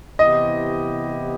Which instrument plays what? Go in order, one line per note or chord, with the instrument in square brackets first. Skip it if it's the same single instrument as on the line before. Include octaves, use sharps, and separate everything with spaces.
[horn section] C3 E3 B3 E4 G4 [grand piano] D#5